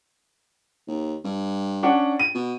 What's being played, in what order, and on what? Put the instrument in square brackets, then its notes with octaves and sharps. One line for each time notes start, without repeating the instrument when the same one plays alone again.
[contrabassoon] D#2
G2
[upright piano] C#4 D4 F#5
D#7
[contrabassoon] B2